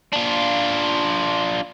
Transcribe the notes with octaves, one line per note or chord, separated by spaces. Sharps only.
D4 F4